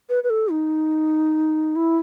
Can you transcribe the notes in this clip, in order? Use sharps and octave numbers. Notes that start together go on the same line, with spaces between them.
B4
B4
A4
D#4
E4